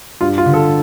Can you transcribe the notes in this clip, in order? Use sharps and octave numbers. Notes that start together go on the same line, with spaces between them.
G2 F4
F4
D3
A4